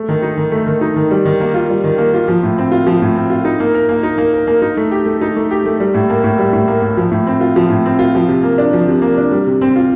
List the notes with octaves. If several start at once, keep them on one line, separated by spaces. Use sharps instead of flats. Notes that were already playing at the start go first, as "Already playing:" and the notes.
Already playing: A3
D#3
D#4
D#3
A3
D#3
D#4
D#3
G3
D#3
A#3
F4
G3
D#3
A#3
F4
F3
A2
C4
F4
F3
A2
C4
F4
D#4
A#3
A#4
A#3
D#4
A#3
A#4
A#3
D#4
A3
G4
A3
D#4
A3
G4
A3
G3
A2
A#3
A2
G3
A2
A#3
A2
F3
A2
C4
F4
F3
A2
C4
F4
F3
C3
A#3
D4
F3
C3
A#3
D4
G3
C3
C4
F4